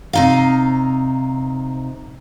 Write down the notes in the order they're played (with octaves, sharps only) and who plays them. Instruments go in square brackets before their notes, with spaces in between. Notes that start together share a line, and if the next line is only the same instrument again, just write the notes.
[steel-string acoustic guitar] C3 D#4 F5